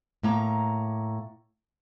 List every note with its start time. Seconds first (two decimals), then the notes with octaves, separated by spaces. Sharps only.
0.23 A2 A#3 A#5